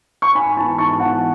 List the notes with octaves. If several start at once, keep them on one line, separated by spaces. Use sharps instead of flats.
C#6
G#2 G#5 B5
E3 B3 A5 C#6
G#2 A5 C#6
E3 B3 F#5 A5